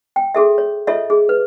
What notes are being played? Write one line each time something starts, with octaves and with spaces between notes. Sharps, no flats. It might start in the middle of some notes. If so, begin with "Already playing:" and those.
G5
F#4 G#4 A4 E5
C#5
F4 A4 C#5 D#5 E5
G#4
B4